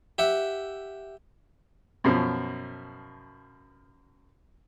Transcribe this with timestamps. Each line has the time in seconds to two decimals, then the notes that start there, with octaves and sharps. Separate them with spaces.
0.18 G4 E5 F#5
2.04 F#2 B2 F3